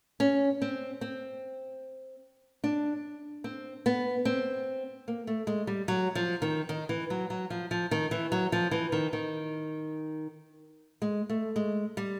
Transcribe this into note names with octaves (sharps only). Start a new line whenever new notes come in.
C#4
C4
C4
D4
C4
B3
C4
A#3
A3
G#3
G3
F#3
F3
D#3
D#3
E3
F#3
F#3
F3
F3
D#3
E3
F#3
F3
E3
D#3
D#3
G#3
A3
G#3
G3